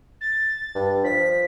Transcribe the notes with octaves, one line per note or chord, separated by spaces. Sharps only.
A6
G2
F3 B6